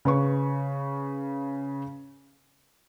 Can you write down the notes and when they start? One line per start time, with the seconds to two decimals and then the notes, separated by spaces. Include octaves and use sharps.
0.05 C#3 B4 C#6